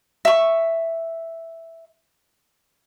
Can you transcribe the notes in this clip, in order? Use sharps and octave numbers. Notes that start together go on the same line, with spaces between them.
E5 C#6